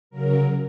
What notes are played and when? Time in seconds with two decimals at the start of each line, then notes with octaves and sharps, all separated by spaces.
0.10 C#3 F#3 A#4